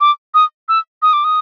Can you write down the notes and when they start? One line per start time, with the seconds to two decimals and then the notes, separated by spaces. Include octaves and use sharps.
0.01 D6
0.34 D#6
0.69 E6
1.02 D#6
1.13 D6
1.24 D#6